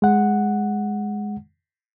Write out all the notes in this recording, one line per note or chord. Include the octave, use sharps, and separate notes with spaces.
G#3 F#5